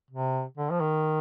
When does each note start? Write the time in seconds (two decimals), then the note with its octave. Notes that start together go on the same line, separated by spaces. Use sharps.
0.10 C3
0.57 D3
0.70 F3
0.81 D#3